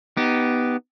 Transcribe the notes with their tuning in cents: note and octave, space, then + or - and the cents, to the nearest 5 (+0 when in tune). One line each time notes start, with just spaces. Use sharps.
B3 +0 D#4 +0 G4 -15